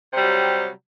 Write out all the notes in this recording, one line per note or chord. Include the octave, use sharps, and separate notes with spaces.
C3 F#3 G3